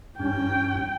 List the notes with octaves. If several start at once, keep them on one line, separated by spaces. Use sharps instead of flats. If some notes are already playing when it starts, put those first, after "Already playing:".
G2 C#4 G5